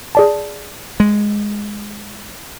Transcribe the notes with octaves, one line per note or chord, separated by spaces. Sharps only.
G#4 D5 A5
G#3